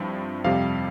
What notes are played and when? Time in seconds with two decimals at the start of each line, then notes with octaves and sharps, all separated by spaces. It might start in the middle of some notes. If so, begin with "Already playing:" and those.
Already playing: G2 F3 C4 E4
0.44 F2 C3 G3 F5